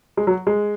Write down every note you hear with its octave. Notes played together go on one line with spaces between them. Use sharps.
G#3
F#3
G#3